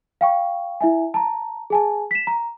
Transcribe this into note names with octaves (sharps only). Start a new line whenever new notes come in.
F5 G5 C#6
E4 E5 G#5
A5 A#5
G#4 G#5 A5
B6 E7
A#5